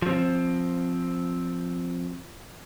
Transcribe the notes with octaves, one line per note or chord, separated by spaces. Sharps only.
F3 C4